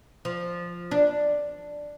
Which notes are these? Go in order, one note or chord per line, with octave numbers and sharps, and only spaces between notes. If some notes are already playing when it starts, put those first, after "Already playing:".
F3
D4